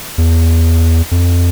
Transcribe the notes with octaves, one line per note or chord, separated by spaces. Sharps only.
E2
F2